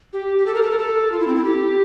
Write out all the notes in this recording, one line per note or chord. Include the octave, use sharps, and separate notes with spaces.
G4
G4
A4
A#4
A4
A#4
A4
F4
E4
C4
E4
G4